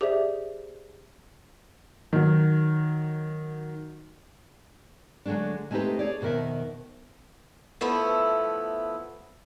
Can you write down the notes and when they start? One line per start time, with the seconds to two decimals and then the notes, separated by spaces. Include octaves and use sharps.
0.01 G4 G#4 C5 D5 E5
2.13 D#3 F#3
5.26 D3 F#3 G#3 A3 D4
5.71 G#3 A3 C4 D#4 G4 B4
5.99 G#4 C#5 D5
6.21 F2 B2 D#3 A#4 E5
7.81 F3 A3 B3 E4